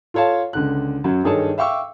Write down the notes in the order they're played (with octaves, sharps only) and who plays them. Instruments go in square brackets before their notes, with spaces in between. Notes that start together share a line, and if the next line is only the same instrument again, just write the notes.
[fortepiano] F4 A4 C#5 F5 A5
C#2 D3 F#6
F#2 F#3
G2 D#3 G#4 A4 C#5 A5
E5 F5 G5 C#6 D6 E6